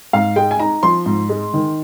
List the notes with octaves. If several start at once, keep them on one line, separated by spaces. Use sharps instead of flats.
G#2 F5
G#3 G5
G#5
D#4 A#5
F3 C6
G#2
G#3
D#3